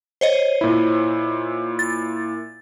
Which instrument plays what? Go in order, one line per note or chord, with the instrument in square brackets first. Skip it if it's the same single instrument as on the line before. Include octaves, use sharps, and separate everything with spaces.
[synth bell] C5 C#5 D#5
[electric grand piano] A#2 E4
[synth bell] A6